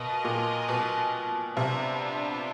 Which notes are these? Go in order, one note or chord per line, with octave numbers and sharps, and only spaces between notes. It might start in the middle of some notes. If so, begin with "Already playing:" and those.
Already playing: B2 F4 A#4 D#5
A#2
B2
C3 B3 D4 F4